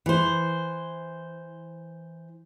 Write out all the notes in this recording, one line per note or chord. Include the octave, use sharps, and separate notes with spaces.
E3 C5